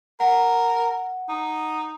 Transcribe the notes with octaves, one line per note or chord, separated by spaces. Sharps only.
A#4 F#5
D#4